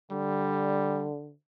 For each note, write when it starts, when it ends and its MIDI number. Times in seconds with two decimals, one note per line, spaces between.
0.11 1.33 50
0.11 1.09 55